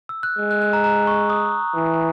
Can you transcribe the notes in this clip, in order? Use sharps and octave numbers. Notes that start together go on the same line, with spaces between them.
E6
F#6
G#3
F#6
F#6
A#5
A#5
C#6
D#6
E3